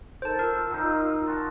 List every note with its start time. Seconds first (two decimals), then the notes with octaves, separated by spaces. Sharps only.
0.22 D#4 A4 A#4 C5 A5
0.39 F4 A#4 E6
0.71 D#3 D#4
1.26 F4 F#4 A5